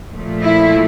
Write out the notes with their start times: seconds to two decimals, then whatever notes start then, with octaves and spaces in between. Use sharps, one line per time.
0.11 A#2 F3 A3
0.41 E4